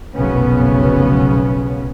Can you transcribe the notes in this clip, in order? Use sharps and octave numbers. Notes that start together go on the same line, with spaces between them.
F1 B1 F#2 C#3 B3 C#4